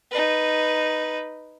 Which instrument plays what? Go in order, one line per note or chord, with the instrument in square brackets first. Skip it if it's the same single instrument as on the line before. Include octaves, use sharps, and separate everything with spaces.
[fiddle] D#4 B4